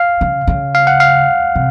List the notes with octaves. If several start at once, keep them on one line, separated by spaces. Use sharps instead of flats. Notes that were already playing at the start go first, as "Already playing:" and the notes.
Already playing: F5
C#3
C#3
F5
F#5
F5
C3